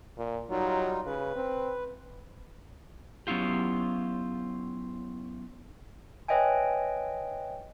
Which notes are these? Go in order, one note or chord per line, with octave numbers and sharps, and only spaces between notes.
A#2
F#3 G3 D#4 F4
C#3 B4
C4
F#3 B3 C#4 E4 F4 G4
B4 C#5 D#5 E5 G5 G#5